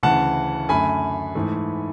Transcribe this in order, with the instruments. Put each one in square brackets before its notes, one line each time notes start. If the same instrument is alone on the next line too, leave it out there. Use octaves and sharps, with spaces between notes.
[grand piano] D2 C#3 E3 F#5 A5
F#2 D3 A3 G#5 B5
G#2 E3 A3